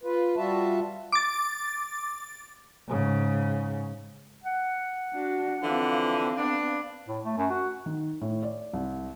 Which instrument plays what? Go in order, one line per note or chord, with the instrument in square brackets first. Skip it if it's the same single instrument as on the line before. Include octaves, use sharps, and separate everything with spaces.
[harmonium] F4 B4
G3 F4 F#4 E5 A5
[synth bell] D6 A6
[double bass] G#2 C#3
[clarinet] F#5
[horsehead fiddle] D4 F#4
[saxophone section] D3 E3 F3 [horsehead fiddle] C4 F5
[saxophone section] B3 D4
[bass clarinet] A2
A3
F#2
F#4
[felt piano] D#3
A2
D5
C2